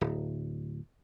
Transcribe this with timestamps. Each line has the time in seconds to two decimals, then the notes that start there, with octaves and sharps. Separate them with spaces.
0.01 D1